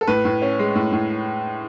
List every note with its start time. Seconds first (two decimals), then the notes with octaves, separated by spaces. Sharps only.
0.01 A4
0.08 A2 B4
0.25 A2
0.42 C#4
0.59 G#3
0.75 A2
0.92 A2